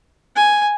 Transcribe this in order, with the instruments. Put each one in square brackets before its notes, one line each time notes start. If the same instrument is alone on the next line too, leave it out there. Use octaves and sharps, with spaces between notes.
[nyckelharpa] G#5